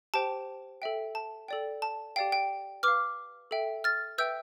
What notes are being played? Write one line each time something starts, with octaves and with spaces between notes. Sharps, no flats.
G4 C5 G5 A5
A4 E5 G5
A5
A4 D5 G5
A5
G4 D5 F5 G5
G5
B4 F5 D6 F6
A4 E5 G5
F6 A6
B4 E5 G5 E6 G6